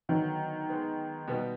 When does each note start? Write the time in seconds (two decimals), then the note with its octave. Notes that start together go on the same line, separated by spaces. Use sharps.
0.09 D3 D#3 F#3 B3
0.68 G#3 B3 D#4
1.27 B2 G3 B3 D#4